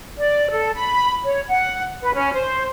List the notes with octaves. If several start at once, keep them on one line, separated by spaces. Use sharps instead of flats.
D5
A4
B5
C#5
F#5
B4
C#4
C5